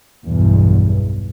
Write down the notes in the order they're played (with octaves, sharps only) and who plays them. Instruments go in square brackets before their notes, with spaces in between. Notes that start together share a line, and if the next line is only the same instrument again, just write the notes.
[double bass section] B1 E2 G2